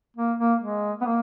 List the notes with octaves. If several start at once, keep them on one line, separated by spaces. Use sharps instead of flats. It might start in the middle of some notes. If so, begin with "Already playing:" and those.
A#3
A#3
G#3
B3
A#3